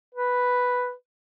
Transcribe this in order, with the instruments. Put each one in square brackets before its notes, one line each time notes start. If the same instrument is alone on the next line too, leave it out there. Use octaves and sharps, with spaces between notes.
[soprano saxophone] B4